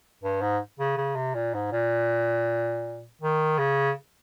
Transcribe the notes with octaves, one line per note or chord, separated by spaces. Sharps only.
G2
G#2
C#3
C#3
C3
A#2
G#2
A#2
D#3
C#3